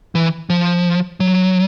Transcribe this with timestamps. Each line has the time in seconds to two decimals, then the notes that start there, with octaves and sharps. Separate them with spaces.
0.15 E3
0.50 F3
1.20 F#3